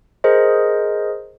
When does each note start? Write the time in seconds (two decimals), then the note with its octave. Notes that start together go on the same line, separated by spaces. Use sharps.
0.24 G#4 A#4 C5 D#5